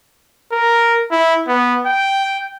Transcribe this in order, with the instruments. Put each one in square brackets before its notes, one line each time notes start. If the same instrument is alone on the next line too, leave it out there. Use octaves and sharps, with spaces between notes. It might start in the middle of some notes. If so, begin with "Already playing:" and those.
[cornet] A#4
E4
B3
G5